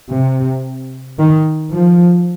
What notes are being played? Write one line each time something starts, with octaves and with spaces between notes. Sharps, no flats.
C3
D#3
F3